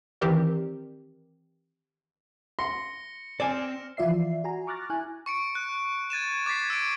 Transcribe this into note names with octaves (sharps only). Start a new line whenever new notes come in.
D#3 E3 C4 G4 A#4 D5
C6 A#6 C#7 G7
C4 D5 G#5 F6 E7
E3 F3 F4 D5 E5 C7
F#4 G#5 A#5
C#6 D6 F6 F#6 A6 A#6
E4 G#5 F#6
C#6 C#7 D7
F#6
G#6 A6 D#7 E7
D6 G#6 A6 B6 C7
E6 D7